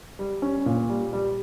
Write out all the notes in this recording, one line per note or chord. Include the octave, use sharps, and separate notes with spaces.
G3
C#4
A#2
G3
G3